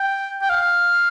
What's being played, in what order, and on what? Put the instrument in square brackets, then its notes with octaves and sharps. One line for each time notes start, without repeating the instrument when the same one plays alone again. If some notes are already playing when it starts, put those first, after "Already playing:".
Already playing: [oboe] G5
G5
F5